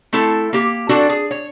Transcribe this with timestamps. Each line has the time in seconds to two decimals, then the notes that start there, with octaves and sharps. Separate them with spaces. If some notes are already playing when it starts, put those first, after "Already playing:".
0.13 A3 C4 E4 A4
0.53 A#3 G4
0.89 C4 D4 F#4 A4 D5
1.09 G#4
1.31 C#5